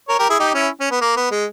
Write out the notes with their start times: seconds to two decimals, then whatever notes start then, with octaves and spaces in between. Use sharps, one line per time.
0.08 A#4 C#5
0.19 G4 A#4
0.29 E4 G#4
0.39 D#4 G4
0.54 C#4 E4
0.80 C#4
0.91 B3
1.01 A#3
1.17 B3
1.31 G#3